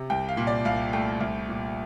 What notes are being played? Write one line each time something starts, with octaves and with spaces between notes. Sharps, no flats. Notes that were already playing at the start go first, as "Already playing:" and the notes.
Already playing: C3
C2 G5
F5
A#2
D5
C2 F5
A3 G5
C2
A#2